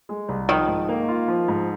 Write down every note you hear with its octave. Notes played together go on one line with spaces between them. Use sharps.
G#3
C2
D#3 F3
G#2
A#3
F4
F3
G#2